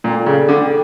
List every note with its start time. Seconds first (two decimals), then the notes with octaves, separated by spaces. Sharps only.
0.04 A#2 A4 D5 G5
0.26 C#3
0.49 D3